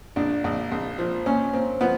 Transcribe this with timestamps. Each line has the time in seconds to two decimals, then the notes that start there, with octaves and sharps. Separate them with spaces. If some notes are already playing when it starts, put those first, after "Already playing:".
0.16 A#1 D4
0.44 A#1
0.71 A#1
0.98 F3
1.26 A#2 C#4
1.53 A#2 C4
1.81 F3 B3